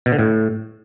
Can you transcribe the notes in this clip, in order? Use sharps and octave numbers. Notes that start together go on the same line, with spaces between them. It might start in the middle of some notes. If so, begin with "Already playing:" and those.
B2
D3
A2